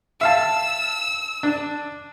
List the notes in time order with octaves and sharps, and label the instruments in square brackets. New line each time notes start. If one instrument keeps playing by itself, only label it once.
[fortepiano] E5 F5 A5 [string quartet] E6
[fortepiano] D4